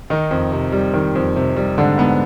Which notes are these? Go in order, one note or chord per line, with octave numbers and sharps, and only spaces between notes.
D#3 D#4
F2
C3
G3
D#3
F2
C3
G3
G#2 D3 D4
G#2 B3